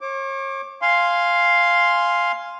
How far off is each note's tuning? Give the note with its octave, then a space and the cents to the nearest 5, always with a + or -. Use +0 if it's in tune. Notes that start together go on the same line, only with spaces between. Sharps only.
C#5 -40 D6 +0
F5 +0 G#5 +0 C6 +0